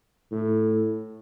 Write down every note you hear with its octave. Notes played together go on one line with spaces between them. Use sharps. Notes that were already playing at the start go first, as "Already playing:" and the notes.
A2